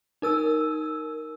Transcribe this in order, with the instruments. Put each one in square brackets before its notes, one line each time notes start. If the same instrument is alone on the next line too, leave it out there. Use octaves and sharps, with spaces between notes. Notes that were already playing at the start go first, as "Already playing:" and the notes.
[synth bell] D#4 A#4 E6